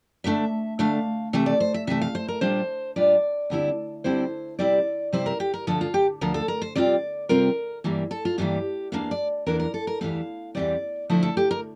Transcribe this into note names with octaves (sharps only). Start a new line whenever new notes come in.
D3 A3 D4 E5
D3 A3 D4 F5
C3 E3 A3 E5
D5
C5
E5
C3 E3 A3 E5
F5
C5
A#4
A#2 G3 D4 F4 C5
A#2 G3 D4 F4 D5
D2 D3 G3 C4 E4
D2 D3 G3 C4 E4 C5
C3 G3 C4 E4 D5
C3 G3 C4 E4 C5
A#4
G4
A#4
D2 D3 F3 A4
F4
G4
D2 D3 F3 A#4
A4
A#4
C5
C3 G3 C4 F4 D5
C3 G3 C4 F4 A#4
G2 E3 G3 A#3
A4
F4
G2 E3 G3 A#3 G4
E2 E3 A#3 D4 F5
D5
E2 E3 A#3 D4 A#4
A#4
A4
A#4
E2 E3 G3 C4 F5
E2 E3 G3 C4 D5
D3 F3 A3 E4 C5
A4
G4
A#4